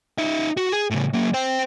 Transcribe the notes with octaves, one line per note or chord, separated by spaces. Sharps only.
D#4 E5
F#4
G#4
A2 C#3
F#3 A#3
C5 G5